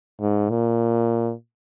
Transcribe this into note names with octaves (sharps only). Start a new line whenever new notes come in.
G#2
A#2